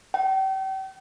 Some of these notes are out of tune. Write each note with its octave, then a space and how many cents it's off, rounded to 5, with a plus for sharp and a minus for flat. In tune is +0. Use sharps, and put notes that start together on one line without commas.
G5 -35